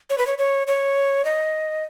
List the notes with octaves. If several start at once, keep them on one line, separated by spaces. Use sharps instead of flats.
C#5
B4
C#5
C#5
C#5
D#5